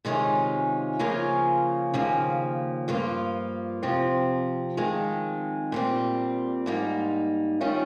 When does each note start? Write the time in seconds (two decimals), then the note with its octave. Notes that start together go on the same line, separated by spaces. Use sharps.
0.05 C3 D#3 G#3 C#4 F4
0.99 C#3 F3 A#3 C#4 F4
1.94 D#2 C#3 F3 A#3
2.88 G2 F3 A#3 F4
3.83 F2 C3 F3 C4
4.77 F2 D#3 G#3 C4
5.72 A#2 G3 C4
6.66 G#2 G3 A#3 D#4
7.61 D#3 G3 C#4 F4